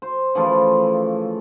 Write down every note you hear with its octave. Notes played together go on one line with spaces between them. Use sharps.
C5
C#3 E3 F3 A3